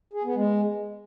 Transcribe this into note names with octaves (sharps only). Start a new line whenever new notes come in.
G#4
B3
G#3